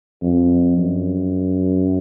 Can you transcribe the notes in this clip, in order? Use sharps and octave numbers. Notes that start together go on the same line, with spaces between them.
F2
F#2